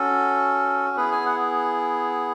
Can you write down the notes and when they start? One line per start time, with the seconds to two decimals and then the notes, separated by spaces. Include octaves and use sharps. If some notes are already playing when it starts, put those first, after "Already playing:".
Already playing: C#4 F#4 A4
0.97 B3 E4 G#4 B4
1.12 G#5
1.26 F#5